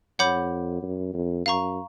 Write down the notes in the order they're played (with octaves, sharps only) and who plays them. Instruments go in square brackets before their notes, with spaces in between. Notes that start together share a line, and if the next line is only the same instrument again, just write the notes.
[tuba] F2 [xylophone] C#5 F#5 B5 D6 G6
[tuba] F#2
F2
[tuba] F#2 [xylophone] F5 A#5 C#6